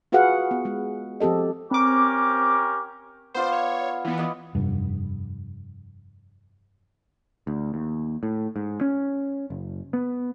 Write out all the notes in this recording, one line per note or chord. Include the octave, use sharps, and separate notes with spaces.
F4 F#4 G#4 B4 F5 F#5
B3
G#3
F3 C4 G4 A4 D#5
C4 C#4 G4 A#4 D6
B3 F4 C5 D5
C#5
E3 B3
E4 D5 D#5
F1 G2
D2
D#2
A2
G#2
C#4
F#1
B3